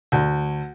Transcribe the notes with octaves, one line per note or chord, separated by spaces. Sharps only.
D2